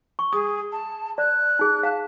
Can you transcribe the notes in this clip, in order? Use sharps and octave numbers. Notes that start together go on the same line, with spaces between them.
C#6
G#4 D#6
A5
D5 F#6
D#4 G#4
F5 A5